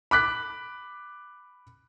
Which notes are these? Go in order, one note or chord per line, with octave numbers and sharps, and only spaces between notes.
B5 D6 F#6 B6